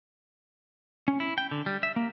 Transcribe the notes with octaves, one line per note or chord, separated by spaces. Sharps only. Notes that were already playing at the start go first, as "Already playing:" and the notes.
C#4
E4
G5
D3
G3
E5
A#3